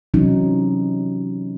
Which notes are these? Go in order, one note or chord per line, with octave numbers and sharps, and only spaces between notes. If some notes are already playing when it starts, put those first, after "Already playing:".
C3 E3 F#3 C#4 D#4